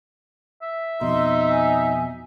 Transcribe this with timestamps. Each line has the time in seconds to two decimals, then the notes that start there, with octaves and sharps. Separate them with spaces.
0.62 E5
1.01 F2 B2 D#4 C6
1.50 G#5